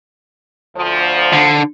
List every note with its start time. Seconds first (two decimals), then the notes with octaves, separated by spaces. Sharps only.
0.76 D2 F3
1.33 D3